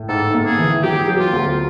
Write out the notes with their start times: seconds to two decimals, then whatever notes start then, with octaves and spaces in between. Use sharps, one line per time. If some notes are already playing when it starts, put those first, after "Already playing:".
Already playing: A2
0.09 G#2 A4
0.34 A#3
0.46 G#4
0.59 E3
0.83 F#3 G4
1.08 F#3
1.20 F4
1.33 D2